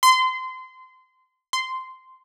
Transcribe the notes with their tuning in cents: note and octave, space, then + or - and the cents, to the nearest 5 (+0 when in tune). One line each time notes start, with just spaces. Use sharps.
C6 -25
C6 -10